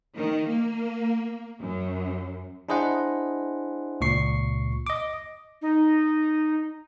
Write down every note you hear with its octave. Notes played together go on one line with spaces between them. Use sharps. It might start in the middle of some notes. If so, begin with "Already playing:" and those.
D#3
A#3
F#2
D4 E4 G#4 C5 D#5 F#5
C#2 A#2 C#6 C7
D#5 D6
D#4